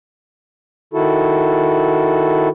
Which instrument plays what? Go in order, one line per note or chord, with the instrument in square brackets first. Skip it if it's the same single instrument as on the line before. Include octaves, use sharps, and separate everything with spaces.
[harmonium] D#3 E4 F#4 A4